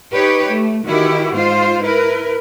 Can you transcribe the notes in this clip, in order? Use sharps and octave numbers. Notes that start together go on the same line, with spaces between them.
D#4 G4 B4 C#5
A3
D#3 E3 E4 F#4 G4
G#2 F4 C5
E4 A#4 B4